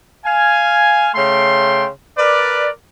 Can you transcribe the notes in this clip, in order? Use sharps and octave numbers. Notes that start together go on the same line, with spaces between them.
F5 G#5
C#3 A3 G5 C6
A#4 B4 D5